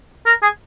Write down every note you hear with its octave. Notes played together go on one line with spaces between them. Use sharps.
A#4
G#4